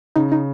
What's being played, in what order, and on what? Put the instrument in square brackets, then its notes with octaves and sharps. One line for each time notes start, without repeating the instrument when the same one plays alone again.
[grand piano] C#3 [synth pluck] D#4
[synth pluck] D#4